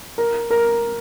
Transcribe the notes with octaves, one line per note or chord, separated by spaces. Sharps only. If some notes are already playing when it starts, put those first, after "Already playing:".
A#4
A#4